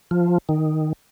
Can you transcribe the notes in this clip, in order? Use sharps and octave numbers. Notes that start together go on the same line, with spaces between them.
F3
D#3